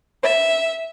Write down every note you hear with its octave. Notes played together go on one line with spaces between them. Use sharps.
E5